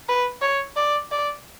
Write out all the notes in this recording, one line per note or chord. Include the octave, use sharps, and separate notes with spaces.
B4
C#5
D5
D5